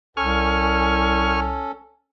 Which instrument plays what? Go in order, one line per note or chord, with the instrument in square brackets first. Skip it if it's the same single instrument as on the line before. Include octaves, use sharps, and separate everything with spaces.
[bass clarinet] C2 [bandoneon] C#4 A4 [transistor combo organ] G#5 C#6 F6